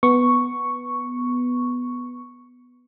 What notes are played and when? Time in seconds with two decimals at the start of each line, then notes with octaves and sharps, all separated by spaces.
0.03 B3 C#6